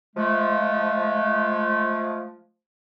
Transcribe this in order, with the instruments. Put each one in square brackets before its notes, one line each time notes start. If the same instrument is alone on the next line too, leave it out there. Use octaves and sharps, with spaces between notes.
[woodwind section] F3 G#3 A3